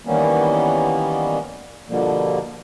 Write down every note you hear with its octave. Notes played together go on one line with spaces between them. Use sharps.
D#3 E3 G3 A#3 B3 C#4
B2 D3 F3 G3 A#3